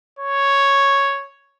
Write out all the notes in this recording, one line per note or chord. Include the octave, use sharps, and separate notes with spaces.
C#5